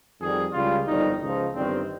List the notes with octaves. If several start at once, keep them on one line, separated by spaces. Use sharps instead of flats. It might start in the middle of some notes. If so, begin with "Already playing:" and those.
F2 D#3 G3 G#4
C#2 C#3 G3 F4
G1 F2 D#3 G3 D#4
C#2 C#3 F3 D#4
G1 G2 D#3 G3 C4